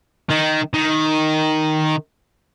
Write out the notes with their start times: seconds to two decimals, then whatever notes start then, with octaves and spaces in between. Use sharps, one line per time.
0.31 D#3
0.74 D#3